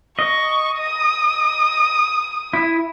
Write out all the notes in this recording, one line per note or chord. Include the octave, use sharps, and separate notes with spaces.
D#5 C#6
D#6
E4